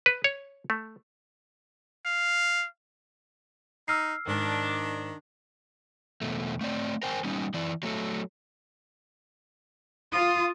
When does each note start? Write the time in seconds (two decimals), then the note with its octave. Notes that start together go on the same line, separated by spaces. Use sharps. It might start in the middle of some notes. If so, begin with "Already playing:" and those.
0.06 B4
0.24 C#5
0.70 A3
2.05 F5
3.88 D#4 E6 F6 C7
4.27 G#2 D#3 D4
6.22 E2 B2 A3
6.61 A3 C4 D5
7.03 A#4 C5 G5 G#5
7.24 G3 B3 C#4 D#4
7.54 E3 E4 D5
7.83 F#3 A3 A4
10.12 F4 D#6